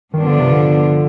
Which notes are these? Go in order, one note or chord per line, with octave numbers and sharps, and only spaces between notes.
G2 D#3 F3 B3 D4 F4
D3
C3
D3